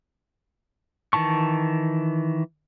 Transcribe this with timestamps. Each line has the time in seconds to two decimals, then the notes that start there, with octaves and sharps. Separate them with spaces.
1.13 D#3 E3 A5 C#6